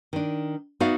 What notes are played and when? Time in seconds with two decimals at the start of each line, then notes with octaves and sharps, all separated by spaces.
0.13 D#3 D4
0.80 B3 D#4 F#4 D5 E5 F5